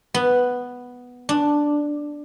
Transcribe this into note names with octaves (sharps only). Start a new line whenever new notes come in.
B3
D4